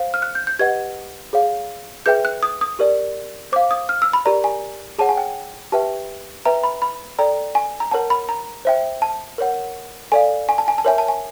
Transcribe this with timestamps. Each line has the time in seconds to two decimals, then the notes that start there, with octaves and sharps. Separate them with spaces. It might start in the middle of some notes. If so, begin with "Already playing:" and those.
Already playing: C5 F5
0.14 F6
0.22 F#6
0.35 G6
0.47 G6
0.59 G4 B4 D#5 F#5 G#6
1.33 G#4 C#5 F5
2.06 G#4 B4 E5 G5 G6
2.25 F#6
2.43 D#6
2.61 D#6
2.79 G4 A#4 D5
3.52 C5 F5 D6
3.71 D#6
3.89 F6
4.02 E6
4.13 B5
4.25 G4 A#4 D5 A#5
4.44 G#5
4.98 G#4 C#5 F#5 A5
5.09 G#5
5.17 G5
5.72 G4 B4 E5 G5 A5
6.45 B4 E5 G5 A#5
6.63 B5
6.82 B5
7.19 A4 D5 G5 A#5
7.55 G#5
7.80 A#5
7.91 A#4 C#5 F#5 A5
8.10 B5
8.29 A#5
8.65 C5 E5 G5
9.02 A5
9.38 A#4 C#5 F#5
10.12 A4 D5 F5 G#5
10.49 G#5
10.58 A5
10.68 G#5
10.78 A5
10.85 A#4 C#5 E5 G#5
10.98 A5
11.08 G#5